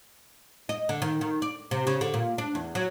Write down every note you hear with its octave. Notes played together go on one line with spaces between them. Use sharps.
D#5
D3
D#3
D#3
D5
C3
C#3
D3
A#2
D4
E2
F#3